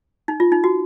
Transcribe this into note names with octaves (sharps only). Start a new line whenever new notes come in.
D#4
F4
D#4
F#4